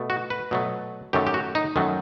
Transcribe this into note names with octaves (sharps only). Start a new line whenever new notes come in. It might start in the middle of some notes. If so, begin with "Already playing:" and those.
Already playing: B2 A3
F#4
B4
B2 F#3 A3
F#2 D#3 F#3 A3 G4
G4
F#4
D#4
F#2 D#3 F#3 A3